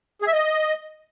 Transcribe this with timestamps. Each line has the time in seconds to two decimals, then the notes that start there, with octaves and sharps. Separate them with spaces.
0.22 G#4
0.27 E5
0.33 D#5